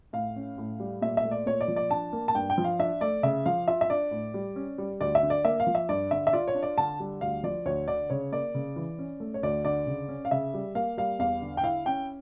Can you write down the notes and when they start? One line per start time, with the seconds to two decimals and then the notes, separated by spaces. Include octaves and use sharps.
0.13 A2 F5
0.36 C#4
0.58 A2
0.80 G3
1.02 A#2 E5
1.17 E5
1.24 A3
1.31 D5
1.46 A#2 C#5
1.61 D5
1.68 F3
1.76 D5
1.91 D4 A5
2.13 A#3
2.28 A5
2.35 G2 G5
2.50 G5
2.58 F3
2.64 F5
2.79 D4 E5
3.01 A3 D5
3.23 C#3 E5
3.46 F3 F5
3.68 F4 E5
3.81 E5
3.90 D4 D5
4.11 A2
4.34 G3
4.56 C#4
4.78 G3
5.01 D2 D5
5.15 E5
5.23 D3
5.30 D5
5.45 A#3 E5
5.60 F5
5.67 F3
5.75 E5
5.89 G2 D5
6.11 D3 E5
6.27 E5
6.33 F4 D5
6.48 C#5
6.55 D4
6.63 D5
6.78 D3 A5
7.00 G3
7.21 D2 F5
7.43 F3 D5
7.66 D2 C#5
7.88 D3 D5
8.10 C#3 C#5
8.32 A#3 D5
8.55 C#3
8.76 E3
8.99 C#4
9.20 A3
9.34 C#5
9.43 D2 D5
9.65 D3 D5
9.86 C#3
10.09 C#4
10.25 F5
10.31 C#3 E5
10.54 G3
10.75 A#3 F5
10.97 G3 F5
11.19 E2 F5
11.42 D3
11.57 G5
11.64 E4 F5
11.86 C#4 G5